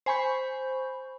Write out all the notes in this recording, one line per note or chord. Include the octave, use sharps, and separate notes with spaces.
C5 G#5 B5 C#6 G6